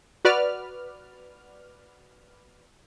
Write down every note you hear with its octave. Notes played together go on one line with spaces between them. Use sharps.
F#4 B4 D5 F6